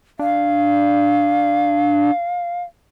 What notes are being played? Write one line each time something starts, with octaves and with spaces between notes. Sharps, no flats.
D4 F5